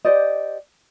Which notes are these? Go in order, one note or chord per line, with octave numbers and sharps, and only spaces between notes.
G4 C5 D5 D#5